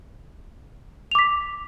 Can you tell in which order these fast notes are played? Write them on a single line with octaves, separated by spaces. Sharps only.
F7 D6 B6